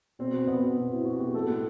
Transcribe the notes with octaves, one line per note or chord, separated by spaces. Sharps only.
B2 C4
B2
B2 B3
B2
B2 C4
B2 E4
B2 F#4
F#4
B2 G4
A2 A4
A2